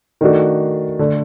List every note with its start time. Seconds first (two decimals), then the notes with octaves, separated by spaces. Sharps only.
0.21 D#3 A3 D4 F#4
0.99 D3 A3 D4